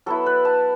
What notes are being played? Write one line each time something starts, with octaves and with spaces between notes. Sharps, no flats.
F#3 B3 E4 A4
B4
A5